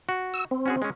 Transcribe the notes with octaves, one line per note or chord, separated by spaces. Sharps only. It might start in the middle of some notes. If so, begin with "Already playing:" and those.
F#4
E6
C4
C#4 F#4 G#4
G#3 C#4